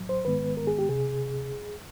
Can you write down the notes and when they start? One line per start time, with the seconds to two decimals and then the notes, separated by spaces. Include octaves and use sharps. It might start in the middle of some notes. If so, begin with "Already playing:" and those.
Already playing: A2 F#3
0.09 C5
0.25 G#2 D#3 G#3 B3 B4
0.57 A#4
0.67 G#4
0.79 G4
0.89 C3 G#4